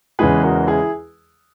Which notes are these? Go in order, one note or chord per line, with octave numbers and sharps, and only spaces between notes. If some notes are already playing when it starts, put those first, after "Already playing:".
E2 C#3 E3 G#3 G#4 B4
F#4 A#4
E4 G#4